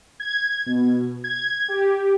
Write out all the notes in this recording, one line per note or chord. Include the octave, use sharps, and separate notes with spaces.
G#6
B2
G#6
G4